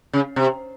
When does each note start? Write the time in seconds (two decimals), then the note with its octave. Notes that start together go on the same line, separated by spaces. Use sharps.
0.13 C#3
0.36 C3